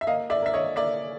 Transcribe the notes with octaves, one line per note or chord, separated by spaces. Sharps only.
E5
A#3 D#5 F5
D5 E5
A#3 E5
C#5 D#5
A#3 D5 E5